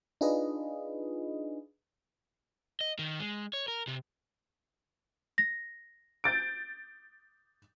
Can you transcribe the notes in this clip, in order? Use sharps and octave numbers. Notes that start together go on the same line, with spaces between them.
D4 D#4 F4 G#4 B4 D#5
D#5
D#3
G#3
C#5
A#4
C3
A#6
G6 A6 D7